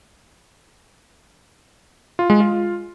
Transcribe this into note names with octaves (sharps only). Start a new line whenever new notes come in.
F4
G#3
F4